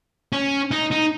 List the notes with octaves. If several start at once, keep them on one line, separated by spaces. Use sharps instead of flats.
C#4
D#4
D#4